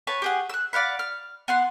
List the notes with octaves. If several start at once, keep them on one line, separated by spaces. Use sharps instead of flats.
B4 C#5 A5
G4 G#4 F#5
E6 F#6
D5 F5 F#5 B5
F6
B3 F#5 C6